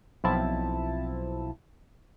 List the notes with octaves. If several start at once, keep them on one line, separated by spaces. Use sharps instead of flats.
B1 F3 C4 E4 A5